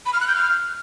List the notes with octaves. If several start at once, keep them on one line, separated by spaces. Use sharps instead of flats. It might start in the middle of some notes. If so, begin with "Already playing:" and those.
B5
F6
F#6
G6
F6